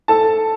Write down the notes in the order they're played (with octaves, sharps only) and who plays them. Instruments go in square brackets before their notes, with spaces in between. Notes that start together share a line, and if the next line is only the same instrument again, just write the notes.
[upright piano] A4 A5